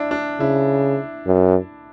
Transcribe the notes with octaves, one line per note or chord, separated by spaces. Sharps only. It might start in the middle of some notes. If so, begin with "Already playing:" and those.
Already playing: D4 E4
D4
C#3 E4
F#2